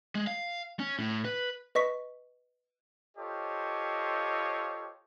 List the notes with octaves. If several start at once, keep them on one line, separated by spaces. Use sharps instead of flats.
G#3
F5
C#4
A2
B4
B4 D#5 C#6 B6
F4 G4 A4 C5 C#5 D#5